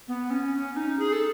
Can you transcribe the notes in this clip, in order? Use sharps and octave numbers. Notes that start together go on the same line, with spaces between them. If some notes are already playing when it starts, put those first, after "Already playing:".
B3
C#4
C#4
D#4
G#4
A4